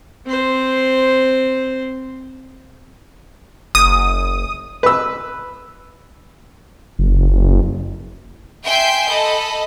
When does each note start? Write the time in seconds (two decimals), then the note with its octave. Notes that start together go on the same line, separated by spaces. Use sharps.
0.26 C4 C5
3.75 F#1 D#6
4.83 B4 E6
6.99 F#1
8.65 E5 G5 G#5 C6 G6
9.10 A4 D#5 B5